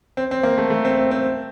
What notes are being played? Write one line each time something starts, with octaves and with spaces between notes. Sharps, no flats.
C4
C4
A#3
A3
A3
C4
C4
C4